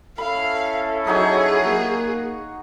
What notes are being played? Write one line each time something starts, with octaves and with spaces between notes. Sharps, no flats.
C#4 E4 A4 F5 B5
F#3 D#4 F#4 G#4 C#5
A#3